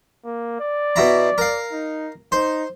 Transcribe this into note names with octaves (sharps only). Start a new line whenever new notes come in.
A#3
D5
B2 E4 A#5
A#4 F5
D#4
D#4 C5